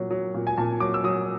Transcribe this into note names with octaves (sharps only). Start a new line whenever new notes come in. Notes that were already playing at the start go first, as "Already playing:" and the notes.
Already playing: A#2 F#3
F#3
A#2
G#5
A#2 A5
F#3 D6
E6
F#3 D#6